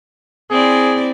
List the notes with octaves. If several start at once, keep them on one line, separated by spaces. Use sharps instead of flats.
C4 E4 G#4 D5